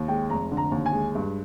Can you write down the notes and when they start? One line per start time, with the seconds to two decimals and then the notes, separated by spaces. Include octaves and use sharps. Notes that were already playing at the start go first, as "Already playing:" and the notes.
Already playing: D#2
0.08 G#3 G5
0.30 F1 A#5
0.51 D3
0.57 A#5
0.71 D#2
0.86 G#5
0.93 G#3
1.15 G2